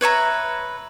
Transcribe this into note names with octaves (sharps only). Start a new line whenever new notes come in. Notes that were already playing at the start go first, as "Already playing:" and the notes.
B4 C#5 E5 A#5